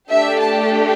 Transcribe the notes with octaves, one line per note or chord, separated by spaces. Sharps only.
A3 D4 G4 E5
A5